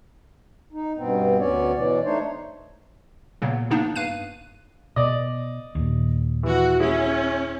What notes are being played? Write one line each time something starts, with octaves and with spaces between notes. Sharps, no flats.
D#4
G2 B2 B3 C4
D2 B3 C#4 C#5 D5
B2 E3 F#3 D5
A3 D4 D#4 C5 C#5
A#2 C#3 F#3 A#3 B3
C#3 F3 A#3 B3 D4 D#4
G2 F5 F#6 D#7
B2 D5 D#5
D#2 A#2
E3 F#4
C#4 E4 G#4